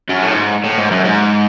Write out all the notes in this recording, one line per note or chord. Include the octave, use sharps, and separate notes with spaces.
F#2
A2
G#2
A2
G#2
F#2
G#2